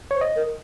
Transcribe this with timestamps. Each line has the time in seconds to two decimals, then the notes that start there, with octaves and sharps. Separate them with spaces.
0.11 C5 C#5
0.21 D#5
0.36 A#4